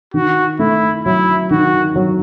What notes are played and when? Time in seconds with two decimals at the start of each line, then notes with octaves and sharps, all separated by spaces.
0.14 D#3 F#4
0.59 A3 E4
1.05 F#3 E4
1.51 D#3 F#4
1.96 F#3